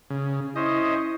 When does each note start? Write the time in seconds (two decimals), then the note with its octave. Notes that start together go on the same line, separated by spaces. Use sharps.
0.10 C#3
0.56 C#4 E4 C5 D#5